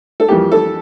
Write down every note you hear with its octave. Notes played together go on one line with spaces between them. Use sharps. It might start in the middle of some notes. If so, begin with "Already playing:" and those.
A4
F2 E3 G3 A#3 G4
A4